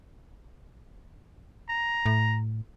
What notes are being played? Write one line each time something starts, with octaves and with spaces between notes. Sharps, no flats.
A#5
A2